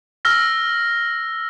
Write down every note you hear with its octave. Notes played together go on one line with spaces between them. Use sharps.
E6 F6 A#6